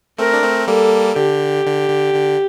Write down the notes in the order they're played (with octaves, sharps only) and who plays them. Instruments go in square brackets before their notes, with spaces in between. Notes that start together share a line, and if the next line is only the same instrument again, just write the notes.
[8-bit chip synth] A3 C4 [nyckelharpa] A#4
[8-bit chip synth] D4
A3 C4
[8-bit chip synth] G3 A#3 [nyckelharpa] A4
[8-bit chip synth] D3 [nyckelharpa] G4
[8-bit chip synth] D3
D3
D3